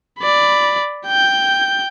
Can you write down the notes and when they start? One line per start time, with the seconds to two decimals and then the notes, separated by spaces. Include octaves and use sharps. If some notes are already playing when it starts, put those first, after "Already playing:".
0.19 D5 B5
1.07 G5 G6